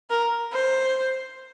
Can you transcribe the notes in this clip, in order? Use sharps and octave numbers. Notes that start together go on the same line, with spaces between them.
A#4
C5